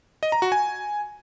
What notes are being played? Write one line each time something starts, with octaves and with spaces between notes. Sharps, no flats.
D#5
A#5
F#4
G#5